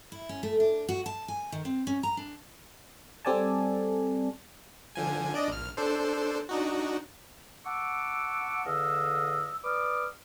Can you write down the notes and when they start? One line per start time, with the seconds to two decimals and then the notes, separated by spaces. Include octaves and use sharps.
0.12 E4
0.29 C#4
0.43 A3
0.60 D4
0.89 F#4
1.06 A5
1.28 G#5
1.52 D#3
1.65 C4
1.87 C#4
2.03 A#5
2.17 D4
3.25 G3 C4 A4 D5 G#5 A5
4.95 D3 F3 G#5
5.34 D4 D5 D#5
5.48 A#1 F6
5.77 D4 A4 C5
6.49 D4 D#4 F#4
7.66 F#5 A5 C#6 D6 E6
8.66 E2 D3 D#5 F5 E6
9.64 B4 D5 D6 D#6 F6